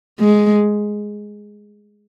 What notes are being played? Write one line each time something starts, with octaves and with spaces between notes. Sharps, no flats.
G#3